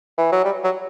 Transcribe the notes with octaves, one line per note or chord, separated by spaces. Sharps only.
E3
F#3
G3
F#3